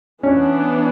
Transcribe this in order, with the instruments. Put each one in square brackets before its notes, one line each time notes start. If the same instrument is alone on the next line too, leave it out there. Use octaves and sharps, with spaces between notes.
[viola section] E3 B3 D4 [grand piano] C#4